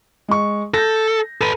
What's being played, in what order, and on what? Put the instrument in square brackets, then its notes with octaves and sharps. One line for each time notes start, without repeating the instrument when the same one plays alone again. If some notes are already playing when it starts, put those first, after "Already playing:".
[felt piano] G#3 C#6
[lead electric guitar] A4 [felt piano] G6 A#6
[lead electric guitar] A4 B4 [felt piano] D#7